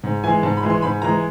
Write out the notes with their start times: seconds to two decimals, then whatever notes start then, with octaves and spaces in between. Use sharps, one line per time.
0.04 G#2
0.24 E3 G#3 G#5
0.43 G#2 A5
0.57 B5
0.63 E3 G#3
0.70 C6
0.82 G#2 B5
1.02 E3 G#3 A#5